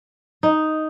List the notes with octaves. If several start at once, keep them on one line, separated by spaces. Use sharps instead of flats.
D#4